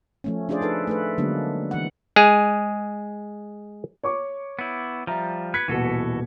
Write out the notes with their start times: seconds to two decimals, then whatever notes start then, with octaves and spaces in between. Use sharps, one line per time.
0.24 F3 A3 C#4
0.49 C#4 D4 F4 G#4 C5 D5
0.61 D#4 A4 B4
0.87 A3 A4 B4
1.18 D3 F#3 G#3 A#3 B3 D4
1.71 E3 F#5
2.16 G#3 G#4
4.03 C#5 C#6 D6
4.59 B3 E4
5.07 F3 G3 E5 A#5
5.54 B4 G#6 B6 C#7
5.68 D#1 B2 E3 F#4 A4